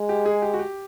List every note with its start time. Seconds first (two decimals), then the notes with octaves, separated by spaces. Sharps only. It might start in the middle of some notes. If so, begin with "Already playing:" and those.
Already playing: G#3
0.09 G4
0.25 G#4
0.42 G4
0.53 F#4
0.59 G4